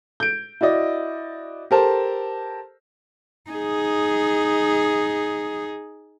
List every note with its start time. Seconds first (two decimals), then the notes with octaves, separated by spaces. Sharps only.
0.20 G6 D7
0.61 E4 F#4 D5 D#5
1.71 G4 A4 A#4 C5 A5
3.51 D#4 G#4